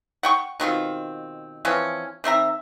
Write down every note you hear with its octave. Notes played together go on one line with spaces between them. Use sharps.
F#5 G5 C#6
B2 D#3 C4 F4
E3 F3 C4 C#4
D#3 C4 E5 A#5